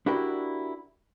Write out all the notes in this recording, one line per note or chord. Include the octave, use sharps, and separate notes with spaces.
D4 E4 F#4 G4 A#4